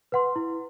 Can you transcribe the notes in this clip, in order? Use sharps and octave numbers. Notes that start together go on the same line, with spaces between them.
B4 F#5 C6
E4